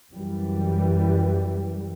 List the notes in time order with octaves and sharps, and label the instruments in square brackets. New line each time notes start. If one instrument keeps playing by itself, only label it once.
[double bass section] F#2 E3 G3